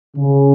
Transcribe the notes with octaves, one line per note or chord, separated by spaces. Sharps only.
C#3